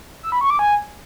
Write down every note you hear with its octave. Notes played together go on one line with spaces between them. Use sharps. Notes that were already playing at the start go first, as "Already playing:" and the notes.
E6
B5
C#6
D6
G#5